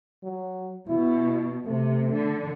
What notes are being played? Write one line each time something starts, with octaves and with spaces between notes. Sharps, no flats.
F#3
B2 E4
C3 A3
D3